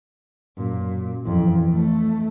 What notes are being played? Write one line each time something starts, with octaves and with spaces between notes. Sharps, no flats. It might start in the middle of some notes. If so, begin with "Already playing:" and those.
F#2 A#2
F2 E3
A3